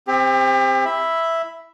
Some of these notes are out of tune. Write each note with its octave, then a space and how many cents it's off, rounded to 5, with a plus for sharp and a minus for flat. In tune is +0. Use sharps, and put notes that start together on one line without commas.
C4 +0 G4 +35
E4 +0 E5 +0 B5 +0